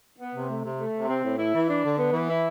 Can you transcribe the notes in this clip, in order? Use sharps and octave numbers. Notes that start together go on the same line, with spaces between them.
B3
C3
A3
C3
A3
C3
C4
A2
E4
E3
D4
D3
B3
E3
E4